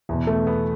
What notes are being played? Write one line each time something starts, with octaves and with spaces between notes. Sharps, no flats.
E2 B2 B3
A3
B3